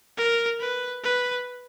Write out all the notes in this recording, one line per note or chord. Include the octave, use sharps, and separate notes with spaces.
A#4
B4
B4